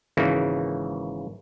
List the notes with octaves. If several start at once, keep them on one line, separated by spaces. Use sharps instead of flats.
G#1 C#3 E3 A#3 D#4